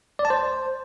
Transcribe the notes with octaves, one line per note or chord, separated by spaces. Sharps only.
D5
A5
C5